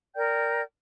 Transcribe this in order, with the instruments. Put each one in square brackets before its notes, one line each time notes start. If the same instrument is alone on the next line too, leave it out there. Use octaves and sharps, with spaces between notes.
[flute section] A#4 D5 G5 G6